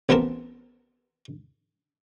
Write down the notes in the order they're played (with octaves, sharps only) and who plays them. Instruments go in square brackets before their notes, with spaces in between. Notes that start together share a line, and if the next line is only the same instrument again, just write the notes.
[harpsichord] A1 B3 C4 A#4 A5